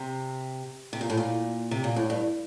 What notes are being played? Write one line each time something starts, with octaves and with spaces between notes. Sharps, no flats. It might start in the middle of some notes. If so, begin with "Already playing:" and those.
Already playing: C3
C3
A#2
A2
A#2
C3
A#2
A2
G2